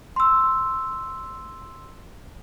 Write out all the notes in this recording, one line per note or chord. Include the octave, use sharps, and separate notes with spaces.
C6 E6